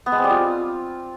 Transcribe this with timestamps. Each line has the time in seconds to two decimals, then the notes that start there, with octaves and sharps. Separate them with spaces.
0.06 B3
0.12 G#3
0.18 C4
0.24 G3
0.30 F4